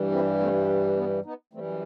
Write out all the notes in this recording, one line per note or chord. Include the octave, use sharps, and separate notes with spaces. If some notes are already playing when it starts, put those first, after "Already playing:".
Already playing: G2 E3 G3
C4 E4
A3 C4
B3
B3 D#4
F#2 E3 G3 A3 C4